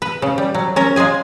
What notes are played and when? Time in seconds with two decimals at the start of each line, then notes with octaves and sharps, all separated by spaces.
0.02 B4
0.22 C#3
0.38 G3
0.55 F#3
0.76 C#4 A#4
0.96 G#3 F4 G#4 G#5